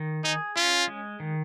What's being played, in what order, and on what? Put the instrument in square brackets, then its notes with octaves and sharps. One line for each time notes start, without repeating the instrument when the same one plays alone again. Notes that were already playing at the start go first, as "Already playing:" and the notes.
Already playing: [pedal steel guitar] D#3
[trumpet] D#4 [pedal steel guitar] G#4
[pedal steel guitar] C#4 [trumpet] F4
[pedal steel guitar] G#3
D#3